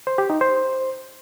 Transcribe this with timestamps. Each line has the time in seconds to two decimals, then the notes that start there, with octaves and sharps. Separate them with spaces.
0.07 C5
0.18 G4
0.30 D#4
0.41 C5